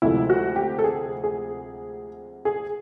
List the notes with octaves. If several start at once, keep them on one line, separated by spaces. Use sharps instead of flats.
D2 C3 F3 G#3 E4
F#4
G4
A4
G#4
G#4
G#4